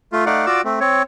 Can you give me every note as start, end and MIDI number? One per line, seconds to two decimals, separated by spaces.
0.13 0.25 57
0.13 0.25 65
0.26 0.46 57
0.26 0.46 63
0.26 0.46 74
0.26 0.46 77
0.26 0.46 78
0.46 0.62 65
0.46 0.62 66
0.46 0.62 74
0.46 0.62 86
0.46 0.62 88
0.65 0.80 57
0.65 0.80 60
0.80 1.03 60
0.80 1.03 73